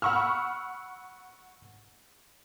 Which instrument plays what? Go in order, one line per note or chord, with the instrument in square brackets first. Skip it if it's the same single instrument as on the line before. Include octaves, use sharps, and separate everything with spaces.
[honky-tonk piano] F#5 B5 C#6 E6 F6